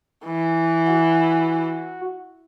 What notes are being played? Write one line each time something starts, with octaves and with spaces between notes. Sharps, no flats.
E3
F#4